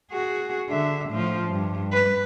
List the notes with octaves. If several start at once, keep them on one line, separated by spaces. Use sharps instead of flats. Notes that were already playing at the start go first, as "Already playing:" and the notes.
F#4 G#4
D3 E5
A2 F3
G2
B4